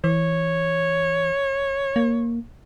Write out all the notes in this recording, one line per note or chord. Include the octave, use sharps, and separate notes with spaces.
E3 C#5
A#3